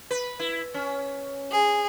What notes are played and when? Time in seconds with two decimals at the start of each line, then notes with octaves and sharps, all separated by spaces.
0.11 B4
0.40 E4
0.74 C#4
1.51 G#4